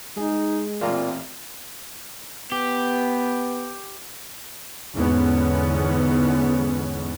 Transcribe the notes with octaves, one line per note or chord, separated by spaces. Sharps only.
G#3 D#4 G#4
A1 A#2 C4 F4 A#5
B3 G4
E2 G#2 D3 B3 C#4